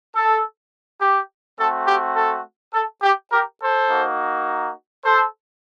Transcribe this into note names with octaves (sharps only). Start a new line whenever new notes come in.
A4
G4
A3 C4 F#4 A4
G4
A4
A4
G4
G4 A#4
A4 C5
A#3 D#4 F#4
A4 C5